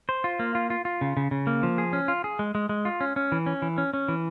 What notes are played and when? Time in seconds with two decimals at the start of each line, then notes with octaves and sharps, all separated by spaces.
0.09 C5
0.24 F4
0.39 A#3
0.55 F4
0.70 F4
0.85 F4
1.01 C#3
1.17 C#3
1.31 C#3
1.47 A#3
1.63 F3
1.78 G#4
1.93 C#4
2.08 F4
2.24 G#4
2.39 G#3
2.55 G#3
2.69 G#3
2.85 F4
3.01 C#4
3.16 C#4
3.32 E3
3.46 C#4
3.62 E3
3.78 C#4
3.93 C#4
4.08 E3